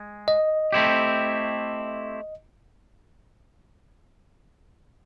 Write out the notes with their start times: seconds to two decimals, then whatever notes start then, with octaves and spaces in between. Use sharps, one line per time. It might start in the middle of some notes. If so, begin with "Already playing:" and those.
Already playing: G#3
0.28 D#5
0.73 A3 C4 E4 G4